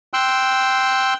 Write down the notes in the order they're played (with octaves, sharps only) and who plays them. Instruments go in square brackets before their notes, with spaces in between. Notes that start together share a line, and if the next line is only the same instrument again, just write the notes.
[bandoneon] G5 C6 E6 F#6